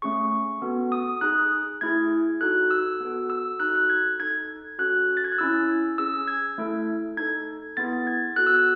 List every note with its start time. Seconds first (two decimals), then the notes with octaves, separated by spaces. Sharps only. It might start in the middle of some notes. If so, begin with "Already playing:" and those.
0.02 A3 C#4 G#4 C#6
0.62 B3 F#4 A4
0.92 D#6
1.21 D#4 G#4 F#6
1.81 A3 E4 G#4 G#6
2.41 D#4 F#4 A4 F#6
2.71 E6
3.00 B3 F#4 A4
3.30 E6
3.60 D#4 F#4 A4 F#6
3.75 F#6
3.90 G#6
4.20 D#4 A4 G#6
4.79 C#4 F#4 A4 F#6
5.17 A6
5.24 G#6
5.32 F#6
5.38 C#4 E4 G#4 E6
5.98 C#4 G#4 E6
6.28 G#6
6.58 A3 E4 A4
7.17 D#4 A4 G#6
7.77 B3 E4 G#4 A6
8.07 G#6
8.36 B3 F#4 A4 F#6
8.46 E6
8.57 E6